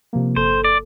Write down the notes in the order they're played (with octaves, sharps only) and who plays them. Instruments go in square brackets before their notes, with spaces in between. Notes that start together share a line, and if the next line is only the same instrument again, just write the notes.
[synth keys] C3 F3 A#3
[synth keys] G1 A4 [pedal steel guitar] C5
[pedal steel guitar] D5